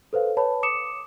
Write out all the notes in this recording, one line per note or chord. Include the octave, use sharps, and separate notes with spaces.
A4 B4 C5 F5
B4 C#5 A5 B5
D6 D#6 C#7 E7